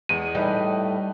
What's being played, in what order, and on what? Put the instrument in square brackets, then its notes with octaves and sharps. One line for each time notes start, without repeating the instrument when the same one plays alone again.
[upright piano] E2 G#3 [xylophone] D#7
[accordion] A2 A3 [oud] G3 [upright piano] D#4 B4 D#5